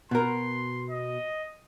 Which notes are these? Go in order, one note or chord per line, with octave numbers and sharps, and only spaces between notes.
B2 A#4 C6
D#5